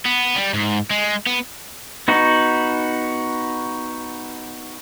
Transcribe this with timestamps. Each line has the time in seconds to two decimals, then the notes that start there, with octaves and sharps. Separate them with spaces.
0.05 B3
0.36 G3
0.54 G#2
0.90 G#3
1.27 B3
2.08 B3 D#4 F#4